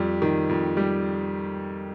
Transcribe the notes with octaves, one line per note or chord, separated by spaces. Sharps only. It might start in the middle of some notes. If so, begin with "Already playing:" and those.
Already playing: F2 G3
D#3
F2
G3